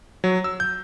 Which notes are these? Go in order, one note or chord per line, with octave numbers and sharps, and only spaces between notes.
F#3
E6
G6